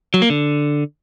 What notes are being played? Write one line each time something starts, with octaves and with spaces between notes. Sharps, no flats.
F#3
A#3
D3